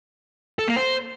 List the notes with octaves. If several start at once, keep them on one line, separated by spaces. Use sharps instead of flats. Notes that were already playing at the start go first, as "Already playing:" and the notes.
A4
A#3
C5